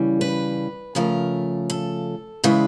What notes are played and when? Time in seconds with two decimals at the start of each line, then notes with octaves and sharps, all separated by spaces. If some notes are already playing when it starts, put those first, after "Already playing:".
Already playing: C#3 E3 G3
0.21 B4
0.95 C#3 F3 A3 A#4
1.70 A4
2.44 C#3 E3 G#3 B4